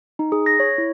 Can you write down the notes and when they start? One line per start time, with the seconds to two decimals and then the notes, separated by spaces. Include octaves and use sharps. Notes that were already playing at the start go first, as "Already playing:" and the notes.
0.19 D#4
0.32 G#4
0.46 A#6
0.60 C#5
0.78 E4